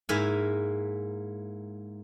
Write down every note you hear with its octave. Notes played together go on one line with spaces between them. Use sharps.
G#2 A#3 E4 E5 F5 G#5